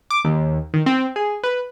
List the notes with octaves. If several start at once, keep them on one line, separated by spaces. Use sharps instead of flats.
D6
D#2
D#3
C4
G#4
B4